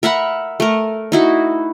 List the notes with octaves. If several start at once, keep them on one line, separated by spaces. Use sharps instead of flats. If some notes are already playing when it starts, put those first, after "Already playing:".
A#4 E5 F#5 B5
A3 A#4
D#4 E4 F#4